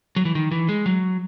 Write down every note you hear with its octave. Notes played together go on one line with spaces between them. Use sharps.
F#3
E3
D#3
E3
G#3
F#3